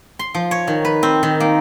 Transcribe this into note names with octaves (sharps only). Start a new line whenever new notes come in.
C6
F3
C#5
D#3
B4
C4
D#3
A#3